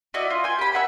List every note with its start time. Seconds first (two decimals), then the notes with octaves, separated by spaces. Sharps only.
0.14 E4 F#4 D5 D#5
0.30 F4
0.44 G5 G#5
0.59 G4 B5
0.72 E5 F#5 G#5 B5